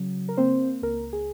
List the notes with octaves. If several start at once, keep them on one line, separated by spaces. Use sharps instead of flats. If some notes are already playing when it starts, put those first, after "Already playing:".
Already playing: C#3 F#3
A#4
A#3 C4 C5
C#2 A#4
G#4